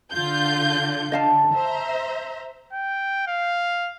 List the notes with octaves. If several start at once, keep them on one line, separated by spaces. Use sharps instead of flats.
D3 F4 G6
D3 D#5 F5 A5
C5 E5 A#5
G5
F5